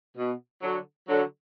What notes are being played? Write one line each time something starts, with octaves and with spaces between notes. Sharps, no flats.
B2
D3 F#3
D3 F#3